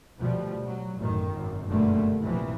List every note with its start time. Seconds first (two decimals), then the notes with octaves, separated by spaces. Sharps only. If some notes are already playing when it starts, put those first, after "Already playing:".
0.20 D2 B2 F3 G3
0.67 F#3
0.98 A1 F#2 B2 D#3
1.30 G#1 F#2
1.67 F#1 G2 B2 D3 A3 A#3
2.21 A#1 C3 E3 F3